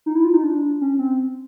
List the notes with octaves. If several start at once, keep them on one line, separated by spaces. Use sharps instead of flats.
D#4
E4
F4
D#4
D4
C#4
C4